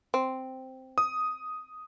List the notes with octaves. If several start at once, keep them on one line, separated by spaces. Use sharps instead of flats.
C4
D#6